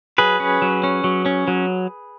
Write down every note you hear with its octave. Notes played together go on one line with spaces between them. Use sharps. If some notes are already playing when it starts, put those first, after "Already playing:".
F#3 G#4 B4
C#4
F#3
C#4
F#3
C#4
F#3